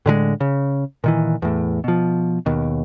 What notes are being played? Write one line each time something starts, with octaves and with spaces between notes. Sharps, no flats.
A2 D3 F3 G#3
C#3
A#2 D#3 E3
E2 A2
B2 F3
D#2 B2